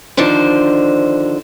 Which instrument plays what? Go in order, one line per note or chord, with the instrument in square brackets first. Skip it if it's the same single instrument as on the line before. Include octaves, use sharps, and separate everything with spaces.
[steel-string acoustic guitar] D3 D#3 F3 D4 C5